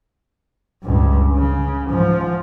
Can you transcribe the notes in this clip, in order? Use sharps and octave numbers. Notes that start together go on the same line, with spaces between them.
C#2 G2
C#3
G#2 F3